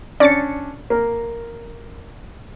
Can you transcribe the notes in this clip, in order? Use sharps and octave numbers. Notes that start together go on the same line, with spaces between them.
C#4 D4 D5 A6 C#7
A#3 A#4